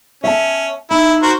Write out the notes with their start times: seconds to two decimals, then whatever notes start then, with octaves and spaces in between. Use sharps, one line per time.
0.24 C#4 E5 G5 A5
0.91 D#4 E4
1.23 F#4 A#4 C5